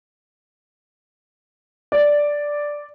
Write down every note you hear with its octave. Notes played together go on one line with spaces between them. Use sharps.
D5